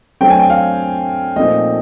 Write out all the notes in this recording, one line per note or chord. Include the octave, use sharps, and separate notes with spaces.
D3 F#3 A3 C4 G5
G#5
G5
F5
A#2 F3 A3 C4 D#4 D#5